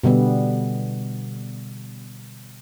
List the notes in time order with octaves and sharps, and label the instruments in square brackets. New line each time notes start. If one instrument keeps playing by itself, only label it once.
[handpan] B2 D3 G3 B3